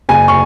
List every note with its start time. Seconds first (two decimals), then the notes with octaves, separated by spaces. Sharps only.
0.09 F#1 G#5
0.28 C#6